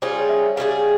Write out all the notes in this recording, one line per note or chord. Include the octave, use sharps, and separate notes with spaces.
G3 C#4 F4 G#4 C5
C#5
E5
G3 C#4 F4 G#4 F5